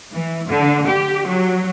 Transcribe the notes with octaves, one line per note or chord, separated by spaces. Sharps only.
E3
D3
G4
F#3